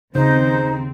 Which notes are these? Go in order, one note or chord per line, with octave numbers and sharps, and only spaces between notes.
D#2 C#3 C4 D#4 C5